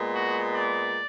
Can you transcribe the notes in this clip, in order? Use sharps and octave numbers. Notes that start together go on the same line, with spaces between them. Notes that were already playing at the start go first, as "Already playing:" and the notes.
Already playing: A#2 G#3 B3
F#4
D5